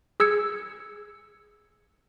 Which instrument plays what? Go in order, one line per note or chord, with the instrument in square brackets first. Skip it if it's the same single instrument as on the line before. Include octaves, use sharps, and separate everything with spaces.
[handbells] G#4 E6 G#6 C#7